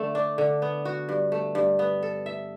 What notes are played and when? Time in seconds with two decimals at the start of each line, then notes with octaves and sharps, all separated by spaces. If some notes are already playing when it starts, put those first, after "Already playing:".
Already playing: D3 A3
0.15 D4
0.38 D3
0.62 B3
0.85 F#4
1.09 G2
1.32 A3
1.55 G2
1.79 B3
2.03 A4
2.26 E5